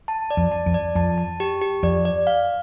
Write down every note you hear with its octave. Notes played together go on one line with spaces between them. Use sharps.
A5
D5
F2
A5
F2
D5
F2 A5
A5
G4
G4
F2 D5
D5
F5